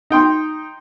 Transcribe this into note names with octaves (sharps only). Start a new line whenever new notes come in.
D#4 G5 C6